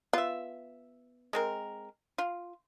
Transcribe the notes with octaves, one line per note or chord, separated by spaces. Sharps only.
B3 F4 E5
G#3 C4 A#4
F4